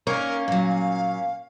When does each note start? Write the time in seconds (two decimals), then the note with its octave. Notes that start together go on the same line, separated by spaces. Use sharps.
0.07 A#3 C#4 D#4 A#4
0.48 A#2 F#3 F5